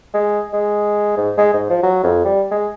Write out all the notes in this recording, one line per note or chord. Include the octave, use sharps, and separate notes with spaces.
G#3
G#3
G#2
G#3
G#2
F3
F#3
F2
G3
G#3